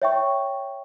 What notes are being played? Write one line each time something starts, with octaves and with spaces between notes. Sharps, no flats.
C#5 E5 G5 C#6